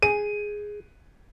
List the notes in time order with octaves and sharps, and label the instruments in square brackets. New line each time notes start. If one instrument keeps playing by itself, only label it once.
[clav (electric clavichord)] G#4 [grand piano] D#7